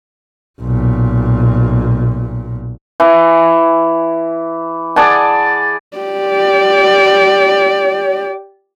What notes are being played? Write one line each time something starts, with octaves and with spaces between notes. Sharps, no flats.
B1 A#2
E3
G#4 D5 F#5 A5
G4 D5